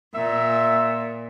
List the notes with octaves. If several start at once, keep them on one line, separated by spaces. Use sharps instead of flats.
A#2 E5